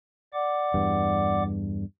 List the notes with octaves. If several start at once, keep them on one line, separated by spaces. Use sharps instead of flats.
D5 F#5 D6
E2 G2